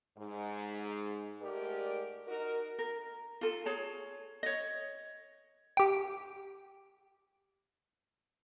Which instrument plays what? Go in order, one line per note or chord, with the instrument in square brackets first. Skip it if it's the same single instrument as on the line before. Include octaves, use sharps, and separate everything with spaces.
[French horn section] G#2
G#2 A3 G4 A#4 D5
D#4 F#4 A#4
[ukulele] A#4
F4 A4
G#4 C#5 A5
C#5 D#5
[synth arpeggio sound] G4 G5